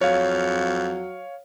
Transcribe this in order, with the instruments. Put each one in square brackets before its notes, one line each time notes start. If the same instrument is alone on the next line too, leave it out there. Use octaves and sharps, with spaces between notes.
[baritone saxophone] F2 [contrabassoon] F#3 [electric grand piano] C#5 F5